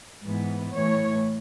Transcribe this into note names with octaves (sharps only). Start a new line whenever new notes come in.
G#2 E3 B3
A2 E3 A3 C#5